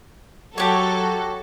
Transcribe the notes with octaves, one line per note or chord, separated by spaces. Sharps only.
F#3 F#4 G4 A4 C#5